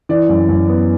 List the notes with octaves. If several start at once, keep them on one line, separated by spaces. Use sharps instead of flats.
E3 D5
F#2
F#2
B3